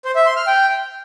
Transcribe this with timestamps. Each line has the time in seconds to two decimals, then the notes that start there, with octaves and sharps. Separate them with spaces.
0.05 C5
0.15 E5
0.26 C6
0.36 F6
0.47 G5